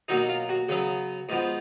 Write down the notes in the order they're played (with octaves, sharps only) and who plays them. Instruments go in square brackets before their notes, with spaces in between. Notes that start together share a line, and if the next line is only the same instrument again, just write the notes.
[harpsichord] B2 F#3 A#3 D#4
F4
F#4
C#3 F#3 B3
G#2 F3 B3